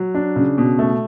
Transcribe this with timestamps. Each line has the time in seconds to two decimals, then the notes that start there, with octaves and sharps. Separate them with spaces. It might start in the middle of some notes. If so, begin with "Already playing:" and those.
Already playing: F#3
0.15 D4
0.36 C#3
0.58 B2
0.79 A3